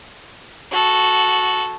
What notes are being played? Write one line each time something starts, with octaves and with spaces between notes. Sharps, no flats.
F#4 A4